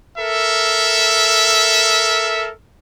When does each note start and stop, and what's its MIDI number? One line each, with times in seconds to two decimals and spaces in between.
0.17 2.51 69
0.17 2.51 70
0.17 2.51 76